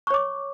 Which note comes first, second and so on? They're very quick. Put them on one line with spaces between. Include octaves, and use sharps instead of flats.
C#6 C#5 D6